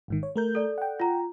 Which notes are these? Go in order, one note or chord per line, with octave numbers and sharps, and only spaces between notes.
G#1 G#2 D#3
C#5
A3 A#4 G6
A4 D5
F#5 G5
F4 A#5